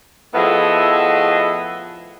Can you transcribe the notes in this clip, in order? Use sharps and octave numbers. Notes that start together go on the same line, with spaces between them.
A2 F3 B3 G#4 D#5 E5